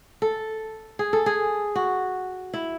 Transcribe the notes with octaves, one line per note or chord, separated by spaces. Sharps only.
A4
G#4
A4
G#4
F#4
E4